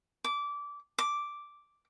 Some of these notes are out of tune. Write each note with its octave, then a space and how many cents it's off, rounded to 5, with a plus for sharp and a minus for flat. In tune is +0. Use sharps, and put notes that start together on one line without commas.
D6 -20
D6 -5